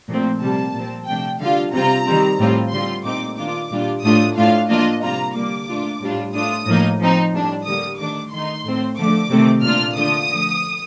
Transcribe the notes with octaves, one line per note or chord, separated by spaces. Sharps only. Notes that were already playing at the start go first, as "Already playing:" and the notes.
A#2 F3 A3 C4
C3 G3 A#3 A5
A#2 F3 C4
C3 F3 A3 D4 G5
D3 G3 D4 F4 F5
C3 G3 C4 F4 A#5
D#3 G3 C4
A2 G3 C4 F4
D3 G3 C4 F4 C6
A#2 A3 C4 D#4 D6
D#3 A#3 D4 F4 D6
A#2 G3 D4 F4
A2 A3 D4 F4 D#6
A2 A3 D4 F4 F5
F3 A#3 D4 F4 D#5
C3 G3 A#3 F4 A#5
D3 G3 A#3 D6
A#2 A3 D4 F4
A2 G3 D4 F4
A2 A3 D4 F4 D#6
A2 F3 A#3 D#4
F3 C4 D#4
A2 G3 D4
D3 G3 A#3 D#6
D#3 A3 D4 D6
D#3 A3 D#4 C6
A2 A3 C4
D3 F3 A3 D6
C3 D#3 A3 C4
A#2 A3 D4 F4 F6
D3 A3 D4 F4 D#6
D3 F3 A3